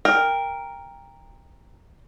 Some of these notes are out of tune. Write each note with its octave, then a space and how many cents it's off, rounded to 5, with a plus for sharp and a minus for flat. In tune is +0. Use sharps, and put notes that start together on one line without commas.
A#4 +0 G5 +25